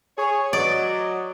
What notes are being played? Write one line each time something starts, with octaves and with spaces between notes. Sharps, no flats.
G#4 C#5
F#3 D5 D#5